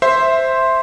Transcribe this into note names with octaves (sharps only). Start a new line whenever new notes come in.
C5 E5 C6